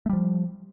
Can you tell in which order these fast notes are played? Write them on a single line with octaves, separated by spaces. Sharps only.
A3 G3 F3